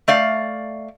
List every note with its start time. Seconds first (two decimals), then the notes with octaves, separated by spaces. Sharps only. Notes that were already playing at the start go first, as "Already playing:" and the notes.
0.08 A3 D5 F5